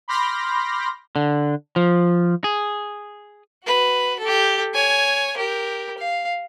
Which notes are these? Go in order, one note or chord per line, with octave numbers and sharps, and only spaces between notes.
B5 C6 D6 F6 G6 A#6
D3
F3
G#4
F#4 B4
G4 A4
C#5 G#5
G4 A#4
F5